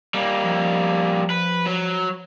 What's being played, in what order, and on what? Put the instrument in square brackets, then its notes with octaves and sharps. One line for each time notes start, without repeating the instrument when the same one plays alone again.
[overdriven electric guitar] G3 A#3
[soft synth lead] F3
[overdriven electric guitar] B4
F#3